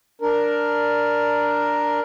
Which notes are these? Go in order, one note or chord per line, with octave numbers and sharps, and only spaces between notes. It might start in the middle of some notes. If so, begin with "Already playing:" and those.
D4 A#4